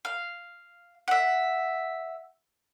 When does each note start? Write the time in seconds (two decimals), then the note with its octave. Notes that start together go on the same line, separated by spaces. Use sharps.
0.05 F5
1.08 E5 F#5